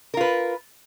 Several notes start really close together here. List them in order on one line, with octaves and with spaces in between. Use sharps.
A#4 F4 B4